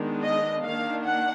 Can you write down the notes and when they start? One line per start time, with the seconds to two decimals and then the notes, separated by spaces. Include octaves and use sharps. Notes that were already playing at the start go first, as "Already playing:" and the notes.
Already playing: D#3 G#3 B3 D4
0.22 D#5
0.63 D#3 A#3 D4 F5
1.04 F#5